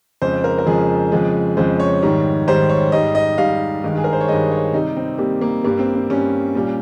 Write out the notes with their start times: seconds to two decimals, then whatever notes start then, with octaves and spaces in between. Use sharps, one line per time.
0.22 F2 C#3 F3 G#3 C5
0.44 A#4
0.58 A#4
0.66 F2 C#3 F3 G#3 G#4
1.12 F2 C#3 F3 G#3
1.57 F2 C#3 F3 G#3 C5
1.80 C#5
2.02 G#2 D#3 G3
2.48 G#2 D#3 G3 C5
2.69 C#5
2.92 G#2 G3 D#5
3.15 D#5
3.38 G#2 G3 F5
3.84 G2 D#3 G#3
3.97 G#4
4.04 A#4
4.13 C5
4.21 C#5
4.28 G2 D#3 G#3 D#5
4.52 C#5
4.73 C3 G3 D#4
4.96 C4
5.18 C3 G3 A#3
5.41 A#3
5.64 G2 G3 A#3
5.79 C4
5.95 C4
6.10 G2 G3 C#4
6.55 A#2 G3